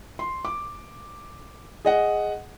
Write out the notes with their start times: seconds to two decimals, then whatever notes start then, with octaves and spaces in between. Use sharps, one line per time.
0.19 C6
0.45 D6
1.85 G#4 D#5 F#5